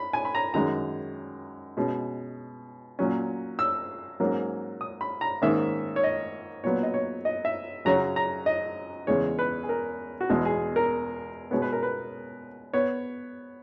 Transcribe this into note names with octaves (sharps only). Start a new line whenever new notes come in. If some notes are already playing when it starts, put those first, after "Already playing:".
Already playing: B5
G#5
B5
A#5
F#2 D#3 G#3 A#5
B2 G#3 C#4
A#2 F#3 C#4
E6
G#2 F#3 A#3 C#4
D#6
B5
A#5
G#2 D#3 A#3 C#4 E5
C#5
D#5
A#2 F#3 B3 C#5
D#5
C#5
D#5
E5
F#2 C#3 F#3 C#4 A#5
A#5
D#5
E2 C#3 G#3 C#5
B4
G#4
A#4
F#4
E2 B2 G#3 G#4
G#4
A#4
B2 G#3 B3 C#5
B4
A#4
B4
B3 C#5